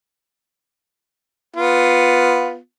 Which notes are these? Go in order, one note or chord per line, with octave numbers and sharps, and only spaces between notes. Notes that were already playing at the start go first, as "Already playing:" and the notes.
B3 F4